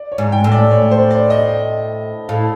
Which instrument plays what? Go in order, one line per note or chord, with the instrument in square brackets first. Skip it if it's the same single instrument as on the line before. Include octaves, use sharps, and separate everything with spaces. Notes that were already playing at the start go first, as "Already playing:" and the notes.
Already playing: [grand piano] D5
C#5
[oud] G#2
[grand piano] G5
[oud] A2
[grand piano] D5
C#5
C5
D5
D#5
[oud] A2 [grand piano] F5